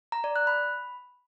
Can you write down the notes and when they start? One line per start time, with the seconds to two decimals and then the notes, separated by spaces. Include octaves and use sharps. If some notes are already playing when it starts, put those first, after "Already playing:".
0.12 A#5
0.24 D5
0.36 F#6
0.47 B5